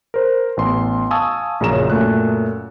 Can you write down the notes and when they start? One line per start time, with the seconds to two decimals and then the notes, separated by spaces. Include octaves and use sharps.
0.14 A#4 C5
0.57 A1 B3 C6
1.11 F5 G#5 A5 C#6 D#6 E6
1.60 A#1 F#2 C#3 C#5 A#5 E7
1.90 F#2 A#2 A3 F#6